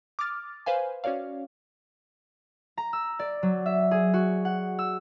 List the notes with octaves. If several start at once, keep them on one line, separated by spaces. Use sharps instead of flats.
D6 D#6 F6 A6
B4 C5 F5 G#5
C#4 F#4 C#5 D5 F5
A#5
E6
D5
F#3
E5
G#4
F#4
F#5
E6